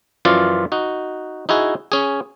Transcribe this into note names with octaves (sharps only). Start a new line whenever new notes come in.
F#2 E3 F3 F4 D5 F5
D#4 F#4
D#4 E4 F#4 G#4
C#4 G#4